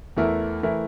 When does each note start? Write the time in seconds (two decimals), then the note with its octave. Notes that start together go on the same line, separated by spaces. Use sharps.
0.17 E2 E3 A3 E4 A#4
0.63 E3 A3 E4 A#4